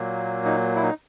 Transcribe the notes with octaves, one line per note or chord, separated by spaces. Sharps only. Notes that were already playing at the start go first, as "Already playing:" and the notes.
Already playing: A#2 F#3 A#3
D#4
E4
D#4